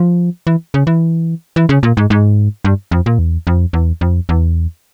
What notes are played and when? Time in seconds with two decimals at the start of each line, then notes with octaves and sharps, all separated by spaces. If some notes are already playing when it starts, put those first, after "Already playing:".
Already playing: F3
0.47 E3
0.74 C#3
0.87 E3
1.56 E3
1.69 C#3
1.83 A#2
1.97 G#2
2.10 G#2
2.65 G2
2.91 F2
3.06 A#2
3.19 E2
3.47 F2
3.73 E2
4.01 F2
4.29 E2